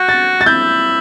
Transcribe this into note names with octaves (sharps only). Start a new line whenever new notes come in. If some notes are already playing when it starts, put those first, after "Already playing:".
Already playing: F#4 G6
A6
A6
E4 G6